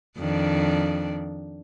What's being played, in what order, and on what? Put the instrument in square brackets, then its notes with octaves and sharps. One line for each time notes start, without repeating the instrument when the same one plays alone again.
[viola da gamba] F2 D#3 D4